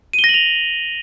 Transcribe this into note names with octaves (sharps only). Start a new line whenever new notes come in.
D#7
G7
A#6
F#7
F7